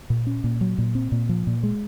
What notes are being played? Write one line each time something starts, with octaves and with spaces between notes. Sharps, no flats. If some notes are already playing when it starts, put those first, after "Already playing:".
A#2
C#4
A#2
F#3
A#2
C4
A#2
F3
A#2
G#3